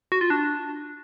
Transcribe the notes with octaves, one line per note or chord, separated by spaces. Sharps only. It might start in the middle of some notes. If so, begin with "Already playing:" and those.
F#4
F4
D4